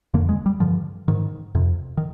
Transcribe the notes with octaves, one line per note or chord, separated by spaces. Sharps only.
F2 D3 A#3
G#3
G3
G2 D3 F3
G#2 D#3
F2 C3
D#3